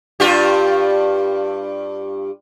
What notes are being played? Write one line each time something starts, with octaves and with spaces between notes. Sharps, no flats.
G2 F4 G4